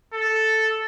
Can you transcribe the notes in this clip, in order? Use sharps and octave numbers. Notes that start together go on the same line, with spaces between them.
A4